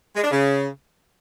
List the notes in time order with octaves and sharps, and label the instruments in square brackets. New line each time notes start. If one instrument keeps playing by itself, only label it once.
[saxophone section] G#3
D4
C#3